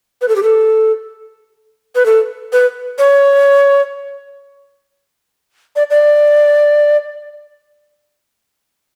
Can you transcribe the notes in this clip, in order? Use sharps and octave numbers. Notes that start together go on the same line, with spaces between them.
B4
A4
G4
A4
B4
A4
B4
C#5
D5
D5